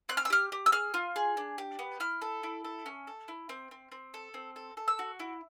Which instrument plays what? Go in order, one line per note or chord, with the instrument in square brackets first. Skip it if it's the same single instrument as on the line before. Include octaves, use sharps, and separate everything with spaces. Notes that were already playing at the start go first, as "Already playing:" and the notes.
[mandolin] C4 F#6
F6
E6
G4 F6
G4
E6
G#4 F6
F4
G#4
D4
G4
B3
E4 F6
A4
E4
A4
C#4
A4
E4
C4
C4
C4
A4
C4
A4
A4
E6
F#4
E4